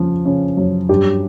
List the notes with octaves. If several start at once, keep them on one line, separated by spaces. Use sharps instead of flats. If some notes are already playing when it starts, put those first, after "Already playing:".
Already playing: C#3 F3
C#3
F#2
G2 G4